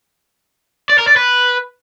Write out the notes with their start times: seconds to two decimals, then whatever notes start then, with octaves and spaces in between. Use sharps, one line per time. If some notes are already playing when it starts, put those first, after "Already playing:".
0.90 D5
0.99 A#4
1.07 D5
1.16 B4